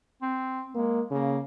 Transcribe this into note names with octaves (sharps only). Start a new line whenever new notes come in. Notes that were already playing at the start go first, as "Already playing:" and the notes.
C4
G#3 A#3
C#3 A#3